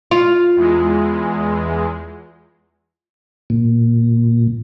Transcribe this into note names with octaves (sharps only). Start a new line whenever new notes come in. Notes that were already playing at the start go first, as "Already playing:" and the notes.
F4
E2 G#3
A#2